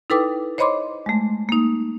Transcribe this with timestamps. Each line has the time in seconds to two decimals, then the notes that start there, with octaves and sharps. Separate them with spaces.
0.10 D#4 E4 A4 B4 G5 D6
0.58 C5 C#5 D#5 B5 C6 D6
1.06 G#3 A3
1.49 A#3 D#4